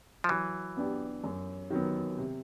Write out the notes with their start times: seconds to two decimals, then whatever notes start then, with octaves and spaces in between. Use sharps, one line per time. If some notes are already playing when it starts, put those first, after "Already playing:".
0.24 F3
0.29 E3 F#3
0.77 B3 D4 G4
1.24 F#2
1.70 D#3 F#3 B3
2.18 C3